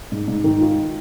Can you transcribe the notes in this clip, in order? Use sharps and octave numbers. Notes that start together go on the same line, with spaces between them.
G#2
G#2
D#3
F4